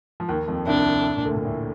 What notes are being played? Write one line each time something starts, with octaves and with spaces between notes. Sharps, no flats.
F3
D#2 D#3
F2 F3
C2 C3 D4
A#2
D2 D3
A#2
A2